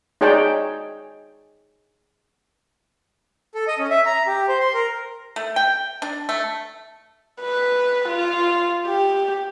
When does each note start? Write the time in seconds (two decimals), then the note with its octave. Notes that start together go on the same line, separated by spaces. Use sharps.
0.21 D#4 G#4 C#5 D5 G5 A5
3.55 A4
3.67 D#5
3.79 C#4
3.90 E5
4.06 A#5
4.27 G4
4.48 C5
4.61 C6
4.74 A#4
5.36 A3
5.56 G5
6.02 D4
6.29 A3
7.41 B4
8.08 F4
8.86 G4